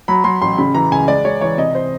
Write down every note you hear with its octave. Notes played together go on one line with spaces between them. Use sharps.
F#3 B5
F#3 C6
A1 C6
C#3 B5
E3 A#5
C#2 G#5
G#3 D5
G#3 C#5
E3 C#5
C3 D#5
C5